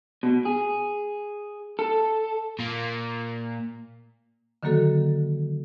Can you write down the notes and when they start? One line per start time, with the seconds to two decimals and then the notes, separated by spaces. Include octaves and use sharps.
0.23 B2
0.45 G#4
1.79 A4
2.59 A#2 A#3
4.63 D3 D#3 F#3 A#3 F#4 A4